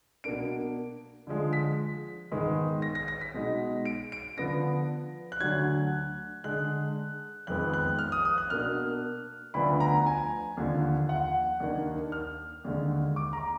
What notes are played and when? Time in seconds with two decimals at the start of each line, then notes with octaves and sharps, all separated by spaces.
0.24 B2 A#3 D4 D7
1.27 D3 F3 G#3
1.53 B6
2.31 G#2 D#3 G#3 B3
2.82 A#6
2.95 A#6
3.08 A#6
3.21 B6
3.34 B2 G#3 D#4
3.85 D7
4.12 D7
4.37 D3 F3 B3 D4 A#6
5.32 F#6
5.40 D2 D3 F#3 D4 G#6
6.44 D3 G#3 D4 F#6
7.47 F2 D#3 G#3 B3 F#6
7.73 F#6
7.99 F6
8.12 D#6
8.25 D#6
8.38 F#6
8.50 B2 A#3 D4 F6
9.54 D2 D3 F3 B3 D4 B5
9.80 A#5
10.06 G#5
10.57 D#2 D3 F3
11.09 F#5
11.60 D#2 D#3 A#3 D4
12.12 F6
12.65 D#2 D3 G#3
13.16 D6
13.33 A#5